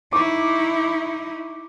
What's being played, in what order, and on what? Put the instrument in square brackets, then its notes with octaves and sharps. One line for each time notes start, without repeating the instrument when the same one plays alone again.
[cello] D#4 E4 [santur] C#6 D6